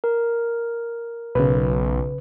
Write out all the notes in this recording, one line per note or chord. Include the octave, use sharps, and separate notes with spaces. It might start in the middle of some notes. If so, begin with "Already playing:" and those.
A#4
B1 C#3 B4